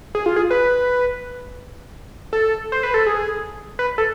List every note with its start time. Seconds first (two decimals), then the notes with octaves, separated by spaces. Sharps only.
0.15 G#4
0.26 F4
0.36 G#4
0.51 B4
2.33 A4
2.72 C5
2.83 B4
2.94 A4
3.07 G#4
3.79 B4
3.98 A4